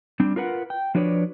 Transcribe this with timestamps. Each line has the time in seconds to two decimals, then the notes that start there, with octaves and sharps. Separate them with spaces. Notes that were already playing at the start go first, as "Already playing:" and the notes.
0.20 G3 C4 D4
0.36 F4 A#4 B4 F#5
0.70 G5
0.95 F3 D4 F#4 B4 C#5 D5